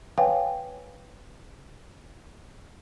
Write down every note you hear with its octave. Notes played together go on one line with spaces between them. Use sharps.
B4 C#5 F5 G5 G#5